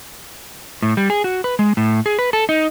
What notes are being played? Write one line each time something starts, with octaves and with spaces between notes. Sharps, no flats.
A2
G3
G#4
F#4
B4
G#3
A2
G#4
B4
A4
D#4